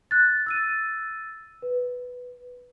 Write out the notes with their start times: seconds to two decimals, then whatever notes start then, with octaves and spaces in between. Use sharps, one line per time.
0.11 F#6 A6
0.46 E6 A6 D#7
1.62 B4